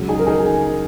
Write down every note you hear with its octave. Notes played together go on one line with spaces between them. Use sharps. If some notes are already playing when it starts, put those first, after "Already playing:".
Already playing: C#2 C#3 F#3
D#4 G#4
A#4
D#4 G#4